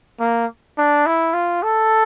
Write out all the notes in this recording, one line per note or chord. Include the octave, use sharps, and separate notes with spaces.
A#3
D4
E4
F4
A4